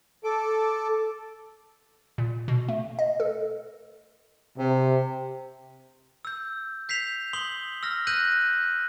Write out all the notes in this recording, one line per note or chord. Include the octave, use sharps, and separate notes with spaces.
A4 D6
A#2
B2
A3
D#5
A4
C3
E6 G6
G6 B6 C7 F7
C6 D#6 F#7 G7
E6 F6 A#6
F#6 G6 A#6 D#7 F#7